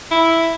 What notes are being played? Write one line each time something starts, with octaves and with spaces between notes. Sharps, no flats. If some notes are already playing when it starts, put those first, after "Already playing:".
E4